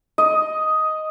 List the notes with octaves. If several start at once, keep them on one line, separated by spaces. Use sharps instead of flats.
D#5